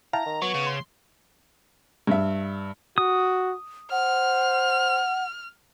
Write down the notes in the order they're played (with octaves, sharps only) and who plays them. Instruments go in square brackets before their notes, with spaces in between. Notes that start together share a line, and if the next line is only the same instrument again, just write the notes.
[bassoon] E4 [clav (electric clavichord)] F5 G5 A5 [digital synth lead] A#5
[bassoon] D#3
[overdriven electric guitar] F#3 [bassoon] B3 [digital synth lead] C#6
[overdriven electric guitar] C#3
[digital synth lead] C6
[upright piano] G2 E5
[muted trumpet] F#4 [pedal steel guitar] D#6
[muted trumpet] C5 [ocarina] F#5 [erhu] F6